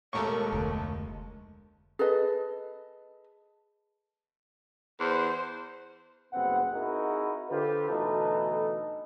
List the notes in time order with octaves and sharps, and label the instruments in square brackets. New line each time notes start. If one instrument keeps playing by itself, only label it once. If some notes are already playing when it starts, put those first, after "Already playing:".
[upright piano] E1 D#2 A3 [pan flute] G#3 [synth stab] A4 A#4 C#6
[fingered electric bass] F1 D2
[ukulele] G#4 A4 B4 D#5
[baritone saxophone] E2 [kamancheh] C5
[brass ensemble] F#1 C2 B3 C4 F#5
C4 D#4 E4 F#4 G#4 A#4
D3 F4 G4 A4 B4 C5
D2 B2 E3 D#4 A4